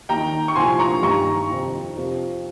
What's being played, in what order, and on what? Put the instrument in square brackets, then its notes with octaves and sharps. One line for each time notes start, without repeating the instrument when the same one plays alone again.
[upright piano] D#2 D#3 G5 A#5
C#6
C2 A#2 F3 G#5 C6
A#5 C#6
G2 D#3 A#5 C#6
F2 C3 D#3
F2 C3 F3